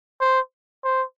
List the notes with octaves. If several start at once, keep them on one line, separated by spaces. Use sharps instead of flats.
C5
C5